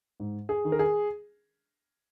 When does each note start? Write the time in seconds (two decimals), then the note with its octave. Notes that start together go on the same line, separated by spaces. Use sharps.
0.20 G#2
0.49 G#4
0.65 D#3
0.72 A#4
0.79 G#4